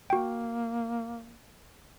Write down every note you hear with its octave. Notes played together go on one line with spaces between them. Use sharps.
A#3 F#4 G5